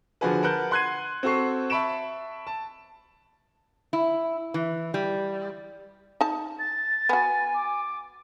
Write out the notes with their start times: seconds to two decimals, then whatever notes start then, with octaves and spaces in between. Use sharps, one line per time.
0.21 D3 F3 F#4 G#4 B4
0.43 A#4 B4 F#5 A5 F#6 G6
0.71 F#5 C6 F#6 G#6 C7 D#7
1.23 C4 F#4 A4 C#6 C7
1.70 E5 A5 B5 C#6 D7 E7
2.47 A5
3.93 E4
4.54 E3
4.94 G3
6.21 D#4 A5
6.59 A6
7.09 B3 F#4 G#5
7.54 D6